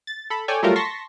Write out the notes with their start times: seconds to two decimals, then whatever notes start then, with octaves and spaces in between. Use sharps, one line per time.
0.07 A6
0.30 A4 B5
0.48 A4 C#5 D5 G5 G#5
0.63 F#3 G3 A3 F4 A4 A#4
0.76 A5 C6 C#6 A#6 B6